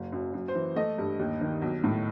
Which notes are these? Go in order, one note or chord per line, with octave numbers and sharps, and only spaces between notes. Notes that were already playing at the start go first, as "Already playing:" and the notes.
Already playing: F#1
F#2
F#2
C5
E3
A3 D#5
G2
D#2
D#3
B1
A2